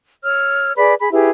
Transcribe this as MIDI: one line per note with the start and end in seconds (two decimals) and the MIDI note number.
0.24 0.72 73
0.24 0.72 88
0.24 0.72 89
0.76 0.94 68
0.76 0.94 71
0.76 0.94 74
0.76 0.94 83
0.99 1.12 68
0.99 1.12 83
1.12 1.31 64
1.12 1.31 67
1.12 1.31 68
1.12 1.31 71